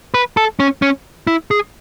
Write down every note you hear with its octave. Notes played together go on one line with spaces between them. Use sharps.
B4
A4
C#4
C#4
E4
G#4